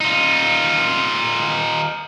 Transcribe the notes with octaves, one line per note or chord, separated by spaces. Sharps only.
D#4 F4